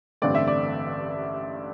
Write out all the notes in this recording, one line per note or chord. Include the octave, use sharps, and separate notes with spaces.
A1 G2 D3 A3 C4 D5
E5
D5